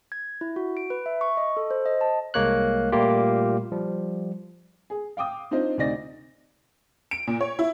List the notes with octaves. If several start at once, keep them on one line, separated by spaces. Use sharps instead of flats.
G#6
E4
F#4
D7
B4
E5
C#6
D#5
A4
C5
D#5
A5
C2 G#3 A#3 C#5 F#6
A#2 G3 A3 A#3 F4 G4
F3 G3
G#4
F5 G5 D6 D#6
C4 D4 D#4 F4 C5
D2 C3 D#4 D5 A#6
D7
A#2
C#5
E4